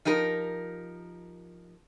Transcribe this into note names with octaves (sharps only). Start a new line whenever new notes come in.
F3 D#4 G4 A#4